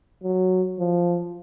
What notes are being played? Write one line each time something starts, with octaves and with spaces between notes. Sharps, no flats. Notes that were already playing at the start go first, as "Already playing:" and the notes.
F#3
F3